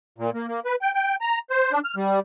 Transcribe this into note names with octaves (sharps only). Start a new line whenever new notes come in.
A#2
A#3
A#3
B4
G5
G5
A#5
C5
D4
F6
G3